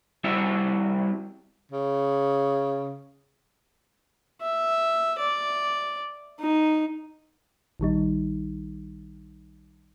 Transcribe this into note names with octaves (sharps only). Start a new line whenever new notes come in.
G3 C4 E4 F#4 E5
C#3
E5
D5
D#4
A#1 D#3 G3 D#4